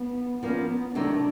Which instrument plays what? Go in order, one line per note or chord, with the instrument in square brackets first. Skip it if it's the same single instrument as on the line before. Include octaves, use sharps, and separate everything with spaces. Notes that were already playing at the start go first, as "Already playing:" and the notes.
Already playing: [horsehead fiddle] B3
[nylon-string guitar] F3 A#3 C#4 [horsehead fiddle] B3
[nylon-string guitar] C3 D#3 F#3 A3 [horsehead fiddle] D4